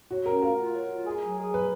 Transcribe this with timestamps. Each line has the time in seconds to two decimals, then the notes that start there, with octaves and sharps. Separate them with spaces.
0.11 F#3 F#4
0.26 C#4 A#4
0.42 F4 A#4
0.57 F4
0.74 F#3
0.90 F4
1.06 G#4
1.21 F#3
1.38 G#4
1.54 F#3 B4